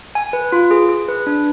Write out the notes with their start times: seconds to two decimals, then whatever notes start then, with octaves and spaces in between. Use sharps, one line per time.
0.15 G#5
0.33 B4
0.52 F4
0.71 G#4
0.89 G#4
1.08 B4
1.27 D4